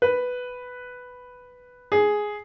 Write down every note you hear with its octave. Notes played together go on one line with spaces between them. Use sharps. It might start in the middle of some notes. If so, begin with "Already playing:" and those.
B4
G#4